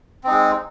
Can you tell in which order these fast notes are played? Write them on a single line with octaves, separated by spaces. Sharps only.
C4 D#4 G#3